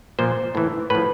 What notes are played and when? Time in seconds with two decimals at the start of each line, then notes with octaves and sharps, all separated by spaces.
0.19 A#2 F3 C5
0.55 A2 E3
0.90 A2 F3 B4